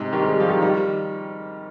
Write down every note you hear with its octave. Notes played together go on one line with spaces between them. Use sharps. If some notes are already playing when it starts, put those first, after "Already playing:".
Already playing: G#2 C3
D#3 G3
G#3
G3
F3
D#3 G3
D#3 G3